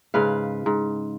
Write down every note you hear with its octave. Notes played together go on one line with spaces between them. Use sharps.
G#2 C#3 B4 F5
G#2